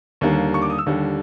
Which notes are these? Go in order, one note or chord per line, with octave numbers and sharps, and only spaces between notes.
D#2 D3 G3 A#3
C#6
D6
D#6
E6
D#2 D3 G3